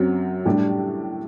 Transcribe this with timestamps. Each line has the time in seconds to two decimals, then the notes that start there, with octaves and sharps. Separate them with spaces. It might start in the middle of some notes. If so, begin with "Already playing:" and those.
Already playing: F#2 F#3 C4
0.45 A2 G3 D4 G4